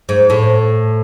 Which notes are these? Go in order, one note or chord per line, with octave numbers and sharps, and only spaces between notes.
G#2
A2